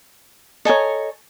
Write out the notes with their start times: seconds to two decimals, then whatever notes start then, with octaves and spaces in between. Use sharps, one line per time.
0.65 A4 C#5 D#5 G#5 A#5